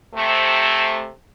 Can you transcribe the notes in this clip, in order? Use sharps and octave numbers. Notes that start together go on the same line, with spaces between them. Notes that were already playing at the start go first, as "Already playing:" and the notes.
C3 A3